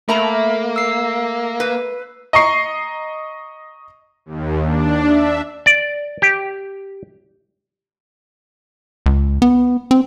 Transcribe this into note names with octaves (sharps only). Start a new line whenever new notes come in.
A3 A#3 A#4 E5 A#5 B5
E6 C7
B4
D#5 A#5 C#6 C7
D#2
D4
E5
D5
G4
C#2
B3
C4